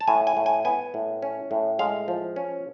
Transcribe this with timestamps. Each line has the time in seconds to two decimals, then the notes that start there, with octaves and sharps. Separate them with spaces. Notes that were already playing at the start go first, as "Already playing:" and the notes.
0.01 A5
0.08 A2 G#5
0.27 G#5
0.37 A2
0.46 G#5
0.65 B3 G#5
0.94 A2
1.23 C#4
1.51 A2
1.79 G#3 F5
2.08 F3
2.36 C#4